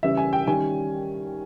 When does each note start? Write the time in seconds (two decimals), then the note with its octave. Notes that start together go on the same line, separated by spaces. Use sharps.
0.03 C#3 E3 G3 C#4 E5
0.17 G#5
0.33 G5
0.47 D#3 G3 C#4 G#5